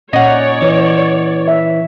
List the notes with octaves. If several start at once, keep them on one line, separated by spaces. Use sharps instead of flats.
A#2 C#4 D#4 C#5 D5 F#5
E3
E5